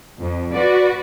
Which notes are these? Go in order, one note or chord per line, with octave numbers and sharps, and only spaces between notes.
F2
F#4 B4 D5